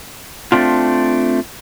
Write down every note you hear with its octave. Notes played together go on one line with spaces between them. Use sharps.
A3 C4 D4 F4